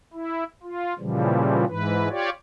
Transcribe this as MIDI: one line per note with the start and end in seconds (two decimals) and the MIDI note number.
0.13 0.44 64
0.63 0.94 65
0.99 1.65 46
0.99 1.65 49
0.99 1.65 52
0.99 1.65 53
0.99 1.65 55
1.68 2.09 44
1.68 2.09 52
1.68 2.09 71
2.10 2.30 65
2.10 2.30 67
2.10 2.30 73
2.10 2.30 74